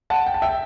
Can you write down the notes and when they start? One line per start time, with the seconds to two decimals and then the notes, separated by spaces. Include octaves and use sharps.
0.10 F#5 A5
0.27 G5
0.34 A5
0.42 E5 G5